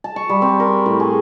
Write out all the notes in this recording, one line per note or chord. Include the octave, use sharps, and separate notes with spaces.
A5
C#6
G3
C4
A#4
A2
G#4